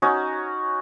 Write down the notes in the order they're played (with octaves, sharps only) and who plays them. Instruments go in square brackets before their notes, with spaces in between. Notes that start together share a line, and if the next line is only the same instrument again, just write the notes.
[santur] C#4 D#4 F#4 D#5